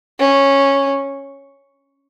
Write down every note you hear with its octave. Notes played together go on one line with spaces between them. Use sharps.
C#4